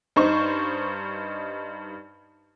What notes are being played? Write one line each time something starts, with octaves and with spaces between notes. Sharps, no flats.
G2 D#4 C5 C#6